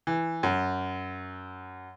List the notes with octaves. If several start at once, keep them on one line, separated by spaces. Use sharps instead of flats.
E3
F#2